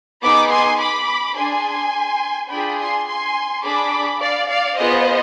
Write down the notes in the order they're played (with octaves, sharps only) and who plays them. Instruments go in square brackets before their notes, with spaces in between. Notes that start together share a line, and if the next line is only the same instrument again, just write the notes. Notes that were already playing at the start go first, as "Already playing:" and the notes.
[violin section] B3 D#4 G#4 B5 D6
G#5 C6
B5 D6
D4 G#4 G#5 C6
D4 F4 G#4 G5 B5
G#5 C6
G#5 C6
D4 G#4 B5 D6
D5 F5
D5 F5
B3 F4 G#4 C5 D#5